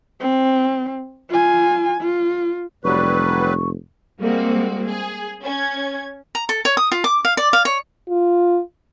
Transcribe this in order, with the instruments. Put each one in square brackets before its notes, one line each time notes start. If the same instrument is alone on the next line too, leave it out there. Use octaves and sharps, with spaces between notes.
[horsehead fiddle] C4
F4 G#5
F4
[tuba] F1 [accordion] F#3 G3 B4 [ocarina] C#6
[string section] G3 G#3 A#3 C4 F#4
G#4
C#4 G#6
[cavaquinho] A#5
A4
C#5
D#6
F4
D6
F5
D5
F5
C#5
[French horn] F4